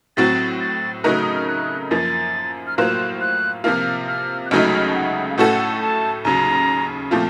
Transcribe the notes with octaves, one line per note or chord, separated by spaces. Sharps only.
A2 F#3 C4 F#4 A6
A6
C#3 F#3 A3 D#4 A#4 F#6
D#6
F6
F#6
F#2 F3 A#3 A6
F6
A2 F#3 A#3 F4 C5 F#6
F#6
C3 F3 A#3 F4 F6
F6
F#6
C#2 C#3 F#3 A3 D#4 F6
F6
A5
F#5
F5
A2 A3 C#4 F#4 A4 F#5
A5
D#2 C#3 F#3 A#5
A#2 F3 A3 C4 F4 A5